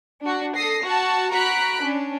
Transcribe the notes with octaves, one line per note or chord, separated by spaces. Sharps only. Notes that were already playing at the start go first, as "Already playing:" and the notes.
D4 F#4
A4 D#6 A#6 C7
F#4 A5
F#4 A#5 B5 F#6 B6 D7
C#4 D4